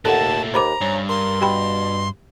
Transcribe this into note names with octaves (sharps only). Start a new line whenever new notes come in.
D#2 A#2 A3 A4 F#5 A5
D#2 C5 A#5 B5 D6
G2 C#4
A#4 C6
B2 G4 G5 B5